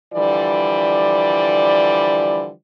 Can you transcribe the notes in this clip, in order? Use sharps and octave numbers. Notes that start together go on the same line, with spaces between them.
D3 E3 F3 G3 D5